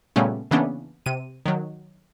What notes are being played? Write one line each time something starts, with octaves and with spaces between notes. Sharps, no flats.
A#2 C#3 G3 A3 B3 C#4
C#3 E3 A#3 B3 C#4 D4
C3 D#7
D#3 F#3